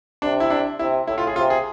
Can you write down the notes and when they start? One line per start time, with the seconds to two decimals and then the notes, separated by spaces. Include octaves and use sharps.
0.22 C3 D4
0.40 E4
0.50 D4
0.79 C3 E4
1.07 A2 E4
1.18 F4
1.27 G#4
1.36 C3 F4
1.50 G#4